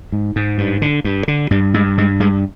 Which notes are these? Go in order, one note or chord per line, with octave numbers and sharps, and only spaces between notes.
G#2
G#2
G2
D3
G2
D3
G2 G3
G2 G#3
G2 G#3
G2 G#3